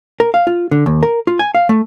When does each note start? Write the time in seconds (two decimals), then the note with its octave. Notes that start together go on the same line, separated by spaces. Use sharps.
0.20 A#4
0.34 F5
0.47 F4
0.71 D3
0.86 D#2
1.03 A#4
1.27 F4
1.39 G#5
1.55 F5
1.69 A3